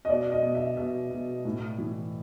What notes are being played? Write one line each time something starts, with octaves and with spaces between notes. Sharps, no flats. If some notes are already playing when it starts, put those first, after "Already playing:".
D#5
B2 D5
D#5
B2
E5
B2 E5
B2
A2
E3